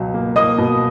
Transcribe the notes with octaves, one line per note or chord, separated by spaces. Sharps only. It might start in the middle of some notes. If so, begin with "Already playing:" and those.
Already playing: C#2 B2 F#3
A#3
A#3 D#5 D#6
B2